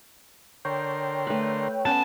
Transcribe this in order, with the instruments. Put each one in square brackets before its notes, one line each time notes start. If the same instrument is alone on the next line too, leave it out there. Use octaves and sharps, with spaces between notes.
[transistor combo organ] D3 A#4 C6 [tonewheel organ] C#5 G5
[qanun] A3 B4
[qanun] B3 C#4 [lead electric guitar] A5